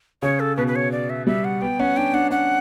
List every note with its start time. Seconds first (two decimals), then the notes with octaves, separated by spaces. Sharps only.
0.22 C#3 C#5
0.40 A4
0.57 B2 B4
0.67 B4
0.76 C#5
0.92 D5
1.10 E5
1.27 G3 E5
1.44 F#5
1.61 B3 G5
1.80 C#4 F#5
1.97 D4 G5
2.14 D4 F#5
2.31 C#4 F#5